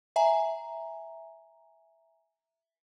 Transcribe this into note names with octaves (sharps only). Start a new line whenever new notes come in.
E5 G#5 A#5